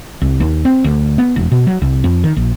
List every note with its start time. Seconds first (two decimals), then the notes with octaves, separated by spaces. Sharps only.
0.22 C2
0.40 D#2
0.65 C4
0.84 D2
1.18 B3
1.36 E1
1.52 B2
1.67 F#3
1.82 C2
2.04 F2
2.24 D#3
2.37 A#1